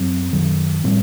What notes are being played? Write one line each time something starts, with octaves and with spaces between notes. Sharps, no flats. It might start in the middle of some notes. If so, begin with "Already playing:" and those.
Already playing: F#2 F#3 C4
F#2 D#3 F#3
A2 G3 C4